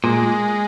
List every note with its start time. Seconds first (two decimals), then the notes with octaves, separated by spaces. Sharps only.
0.04 A#2 G#3